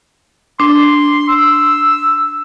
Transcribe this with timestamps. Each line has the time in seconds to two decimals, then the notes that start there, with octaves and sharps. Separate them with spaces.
0.60 D4 C6
1.29 E6